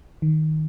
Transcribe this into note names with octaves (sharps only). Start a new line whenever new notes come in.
D#3